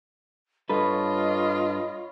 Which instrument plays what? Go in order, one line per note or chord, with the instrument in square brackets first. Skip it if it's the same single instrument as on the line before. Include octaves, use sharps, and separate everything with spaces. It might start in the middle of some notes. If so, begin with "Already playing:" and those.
[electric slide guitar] G2 A4 B4 [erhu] F4 [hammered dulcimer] C#5 B5 [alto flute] D#5